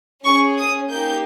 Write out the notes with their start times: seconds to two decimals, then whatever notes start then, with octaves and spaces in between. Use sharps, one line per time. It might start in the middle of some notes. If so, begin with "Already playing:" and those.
0.24 C#4 G#4 C#6
0.58 D#6
0.91 A#3 D#4 G4 G6